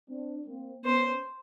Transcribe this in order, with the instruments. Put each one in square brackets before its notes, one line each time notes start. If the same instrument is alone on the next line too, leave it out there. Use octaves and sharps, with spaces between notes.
[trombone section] C4 D4
A#3 C4
[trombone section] B3 C#4 [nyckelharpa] C5